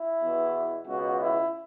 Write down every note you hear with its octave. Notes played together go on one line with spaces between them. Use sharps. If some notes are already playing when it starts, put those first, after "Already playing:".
Already playing: E4
E2 B2
C#2 B2 F#4
E4